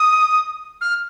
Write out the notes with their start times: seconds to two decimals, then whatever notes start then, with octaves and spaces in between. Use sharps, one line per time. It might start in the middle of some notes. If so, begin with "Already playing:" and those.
Already playing: D#6
0.81 F6